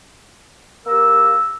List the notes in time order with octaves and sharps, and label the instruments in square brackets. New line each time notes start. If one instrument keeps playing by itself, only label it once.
[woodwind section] A#3 G4 A#4 E6